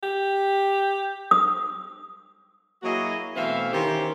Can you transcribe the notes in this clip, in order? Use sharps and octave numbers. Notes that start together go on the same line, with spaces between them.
G4
D#6
F#3 A#3 E4 F#4 G#4 D#5
B2 E3 A3 C4 E5 F5
D#3 E3 C#4 G4 C5